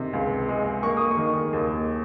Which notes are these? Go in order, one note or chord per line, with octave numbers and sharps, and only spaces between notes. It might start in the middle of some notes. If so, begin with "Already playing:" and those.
Already playing: C3 D#3
C#2
G#3
A#3 C#6
D#6
C#6
D#3
D#2